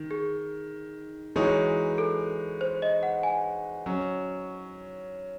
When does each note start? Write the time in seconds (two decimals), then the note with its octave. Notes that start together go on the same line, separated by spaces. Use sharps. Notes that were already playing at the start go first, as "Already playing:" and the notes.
Already playing: D#3
0.11 G#4
1.36 E3 G#3 D#4 F#4 C#5
1.98 A4
2.61 C5
2.82 D#5
3.03 F#5
3.23 G#5
3.86 F#3 C#4